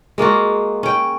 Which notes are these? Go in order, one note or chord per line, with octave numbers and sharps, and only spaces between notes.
G#3 A#3 F4 F#4
C#4 G5